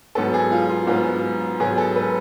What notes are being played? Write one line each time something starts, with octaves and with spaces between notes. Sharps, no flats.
G#2 F#3 B3 A4
G#4
F4
F4
G#2 F#3 B3 F4
G#2 F#3 B3 G#4
A4
B4